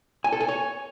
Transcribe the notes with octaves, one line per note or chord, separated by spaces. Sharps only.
G#5
A4
G#5
C#5